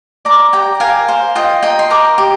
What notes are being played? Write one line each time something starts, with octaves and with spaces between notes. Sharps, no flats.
D5 A#5 D6
G4 G5 A#5
A#4 F5 G#5
C5 F5
F4 D#5 G5
D#5 G5 A#5
C6
A#4 A#5 D6
G4